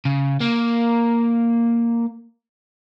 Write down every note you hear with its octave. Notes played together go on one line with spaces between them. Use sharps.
C#3
A#3